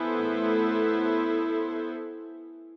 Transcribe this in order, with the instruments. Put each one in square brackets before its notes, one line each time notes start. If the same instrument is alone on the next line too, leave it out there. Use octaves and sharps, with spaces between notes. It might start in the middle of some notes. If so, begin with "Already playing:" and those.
Already playing: [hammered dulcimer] E3 [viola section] B3 E4 A4 C5
[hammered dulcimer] A2